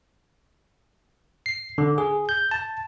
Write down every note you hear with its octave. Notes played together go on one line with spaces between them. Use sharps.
C7
D3
G#4
G6
A5